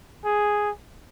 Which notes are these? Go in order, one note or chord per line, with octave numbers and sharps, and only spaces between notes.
G#4